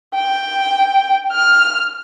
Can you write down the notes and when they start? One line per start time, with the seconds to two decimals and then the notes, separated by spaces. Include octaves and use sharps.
0.14 G5
1.32 F6